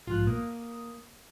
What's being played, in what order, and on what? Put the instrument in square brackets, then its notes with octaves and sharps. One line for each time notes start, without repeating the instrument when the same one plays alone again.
[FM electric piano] A#1 G#2 F#6 [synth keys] F4
[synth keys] A#3 [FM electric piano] D#6